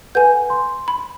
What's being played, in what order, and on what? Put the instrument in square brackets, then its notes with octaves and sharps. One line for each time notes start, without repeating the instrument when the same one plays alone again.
[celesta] A4 B4 F#5 [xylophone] G#5 G6
[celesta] C6
[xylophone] B5